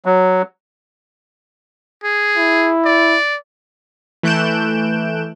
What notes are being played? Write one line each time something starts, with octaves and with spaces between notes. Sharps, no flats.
F#3
G#4
E4
D5
E3 A3 F#6 G6 D7 E7